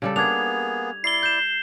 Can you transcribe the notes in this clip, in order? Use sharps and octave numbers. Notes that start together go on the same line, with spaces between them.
C#3 G3 A4
A#3 B3 D4 G#4 G#6 F7
E4 D5 C7 G7
G6 E7